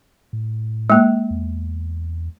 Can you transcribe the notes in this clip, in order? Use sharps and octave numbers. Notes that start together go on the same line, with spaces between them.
A2
G#3 A#3
E2